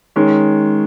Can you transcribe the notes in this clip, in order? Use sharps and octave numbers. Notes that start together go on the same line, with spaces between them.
D#3 G#3 C#4